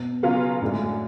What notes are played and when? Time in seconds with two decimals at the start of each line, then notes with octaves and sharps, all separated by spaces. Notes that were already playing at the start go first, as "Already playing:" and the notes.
Already playing: B2
0.23 C#3 F#3 B3 F4
0.62 F#2 A2 D3 G#3